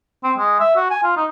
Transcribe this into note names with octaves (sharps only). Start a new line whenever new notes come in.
C4
G#3
E5
F#4
G#5
F4
D#4